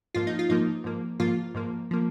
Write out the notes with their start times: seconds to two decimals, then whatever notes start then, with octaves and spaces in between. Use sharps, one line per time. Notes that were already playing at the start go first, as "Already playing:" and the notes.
0.14 G#2 F3 A#3 F4
0.27 D#4
0.39 F4
0.49 G#2 F3 A#3 D#4
0.84 G#2 F3 A#3
1.19 G#2 F3 A#3 F4
1.55 G#2 F3 A#3
1.91 F3 A#3